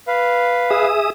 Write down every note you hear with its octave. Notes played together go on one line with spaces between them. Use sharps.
B4 F5
G#4 E5 D#6